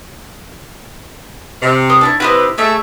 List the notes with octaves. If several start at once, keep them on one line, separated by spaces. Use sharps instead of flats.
C3
C5 D#6
D4 E4 C#5
C3 E4 G4 B4 C5 D#5
A3 G#4 C#5 E5